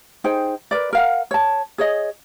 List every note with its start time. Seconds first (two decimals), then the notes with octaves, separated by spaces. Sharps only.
0.24 D#4 G#4 C5 G5
0.71 A#4 B4 D5
0.93 A#4 F5 F#5
1.31 C#5 A5
1.78 G#4 C#5 D#5